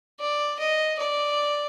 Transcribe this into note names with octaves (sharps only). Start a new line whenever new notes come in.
D5
D#5
D5